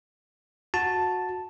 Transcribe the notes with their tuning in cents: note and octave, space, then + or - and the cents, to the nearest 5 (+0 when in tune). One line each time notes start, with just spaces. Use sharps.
F#4 -15 A5 +0